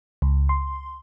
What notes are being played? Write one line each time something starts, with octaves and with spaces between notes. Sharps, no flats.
C#2
C6